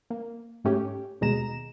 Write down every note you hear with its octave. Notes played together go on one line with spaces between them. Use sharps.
A#3
G#2 A3 C#4 G4
D#2 B2 G#3 A#5 E7